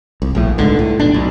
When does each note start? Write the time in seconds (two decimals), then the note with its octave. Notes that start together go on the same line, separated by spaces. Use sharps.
0.22 C2
0.35 A#1 A2
0.58 C#2 G#2 D3
0.79 A2
0.99 F1 B2 D4
1.14 B1